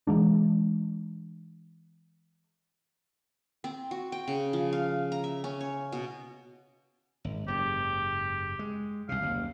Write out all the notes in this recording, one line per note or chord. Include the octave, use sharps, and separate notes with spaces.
E3 F3 G#3 D4
C4
F#4
G5
C#3
F3
F5
A#5
E5
C#4
C#5
B2
G#1
F#1 G#2 G4
G#3
C2 C3 F5
F#1 D#2